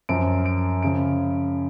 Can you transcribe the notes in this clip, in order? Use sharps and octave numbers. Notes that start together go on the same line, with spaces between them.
F#2 F3 D7
D7
C#3 F3 D7